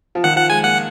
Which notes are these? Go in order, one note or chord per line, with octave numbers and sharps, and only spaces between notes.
F3
D#3 F#5
F3 F#5
G#3 G#5
A#3 F#5